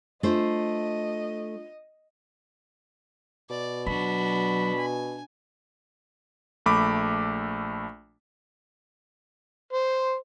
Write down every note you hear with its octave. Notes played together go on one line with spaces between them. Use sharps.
A3 D4 F4 C5 D#5
B2 D5
F#3 D4 F#4 B5
G#5
A#1 A3 B5 D6
C5